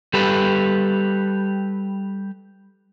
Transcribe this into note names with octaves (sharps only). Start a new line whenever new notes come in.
G3 G4 A4 B4